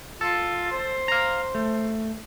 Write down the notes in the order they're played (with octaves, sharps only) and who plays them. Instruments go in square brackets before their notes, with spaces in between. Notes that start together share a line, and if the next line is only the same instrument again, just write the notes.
[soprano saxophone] F4 [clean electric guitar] A4
[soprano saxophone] C5
[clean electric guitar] F5 A#5
A3